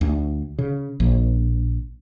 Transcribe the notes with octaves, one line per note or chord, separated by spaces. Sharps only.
D2
C#3
A#1